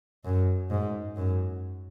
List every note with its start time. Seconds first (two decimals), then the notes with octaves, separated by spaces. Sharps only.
0.25 F#2
0.70 G#2
1.16 F#2